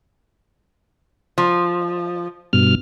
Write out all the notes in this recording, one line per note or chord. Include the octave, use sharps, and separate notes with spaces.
F3
G2 B2 F6